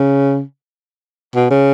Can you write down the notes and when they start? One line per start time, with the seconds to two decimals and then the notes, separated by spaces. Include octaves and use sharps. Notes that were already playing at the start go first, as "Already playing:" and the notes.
Already playing: C#3
1.35 B2
1.50 C#3